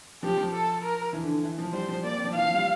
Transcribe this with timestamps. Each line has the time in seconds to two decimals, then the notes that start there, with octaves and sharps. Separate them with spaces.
0.23 F3 G4
0.37 F3
0.53 A4
0.82 A#4
1.13 E3
1.23 D3
1.34 D3
1.43 E3
1.58 F3
1.73 G3 C5
1.88 F3
2.03 A#3 D5
2.13 C4
2.24 F3
2.33 E3 F5
2.44 F3
2.54 G3